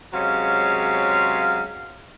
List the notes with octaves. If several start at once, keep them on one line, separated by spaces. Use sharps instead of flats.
C3 F#3 G#3 C#4 F5